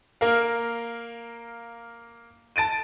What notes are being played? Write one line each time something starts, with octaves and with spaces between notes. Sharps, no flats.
A#3 A#4 F5
A5 A6 D7 D#7